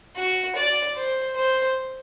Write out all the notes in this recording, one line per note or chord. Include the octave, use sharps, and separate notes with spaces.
F#4
D5
C5
C5